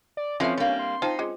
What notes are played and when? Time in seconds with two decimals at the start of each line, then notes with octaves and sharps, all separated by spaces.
0.17 D5
0.40 F3 C4 C#4 E4 A4 B4 E5
0.57 G3 A#3 D4 F5
0.79 C6
1.02 D#4 F4 C5 G5 A5
1.19 G#3 C#4 F4